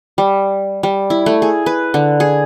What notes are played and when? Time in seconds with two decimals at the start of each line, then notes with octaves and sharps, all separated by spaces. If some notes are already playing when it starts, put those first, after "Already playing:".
0.18 G3
0.83 G3
1.10 E4
1.26 A3
1.42 G#4
1.66 B4
1.94 D3
2.20 G#4